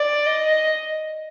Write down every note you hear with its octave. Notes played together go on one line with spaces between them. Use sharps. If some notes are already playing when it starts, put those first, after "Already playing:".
Already playing: D5
D#5